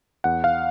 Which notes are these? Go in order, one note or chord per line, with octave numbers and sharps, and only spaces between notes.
E2 F#5
F5